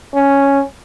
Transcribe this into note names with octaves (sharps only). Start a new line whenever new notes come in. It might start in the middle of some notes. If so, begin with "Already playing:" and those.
C#4